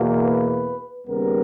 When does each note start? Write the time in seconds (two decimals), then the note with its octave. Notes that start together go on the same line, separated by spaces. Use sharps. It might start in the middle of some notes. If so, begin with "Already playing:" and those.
Already playing: E2 B2 A#3
0.23 B4
1.07 D#2 C#3 G3 B3 A#4